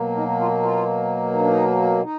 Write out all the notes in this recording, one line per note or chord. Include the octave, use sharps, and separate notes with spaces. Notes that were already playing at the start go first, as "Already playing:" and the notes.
Already playing: B2 F#3 A#3
D#4
F4
F4
D#4
D4
D#4
D#4